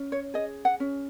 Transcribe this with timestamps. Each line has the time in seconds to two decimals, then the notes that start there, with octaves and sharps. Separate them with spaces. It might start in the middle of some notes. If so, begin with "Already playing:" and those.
Already playing: C#4
0.12 C#5
0.34 G#4 D#5
0.65 F#5
0.80 C#4